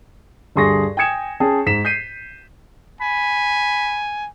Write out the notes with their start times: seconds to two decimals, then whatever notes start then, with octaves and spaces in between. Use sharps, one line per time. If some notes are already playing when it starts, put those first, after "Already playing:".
0.56 D2 G2 G#4 C6 C#6 A#6
0.97 G5 G#5 D#6 G#6 C#7 E7
1.40 C#4 G#4 G5 A5
1.66 G#2 B6 E7
1.85 G6 B6 C7 D#7
3.01 G#5 B5